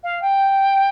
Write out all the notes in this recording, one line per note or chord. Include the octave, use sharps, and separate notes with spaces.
F5
G5